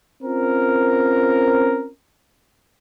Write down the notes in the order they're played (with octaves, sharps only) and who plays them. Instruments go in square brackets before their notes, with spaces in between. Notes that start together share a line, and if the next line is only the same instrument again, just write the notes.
[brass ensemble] C4 C#4 F4 A#4